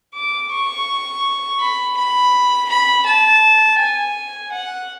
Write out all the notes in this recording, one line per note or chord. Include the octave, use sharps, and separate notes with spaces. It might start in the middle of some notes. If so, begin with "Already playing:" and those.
D6
C#6
B5
B5
B5
A5
G#5
F#5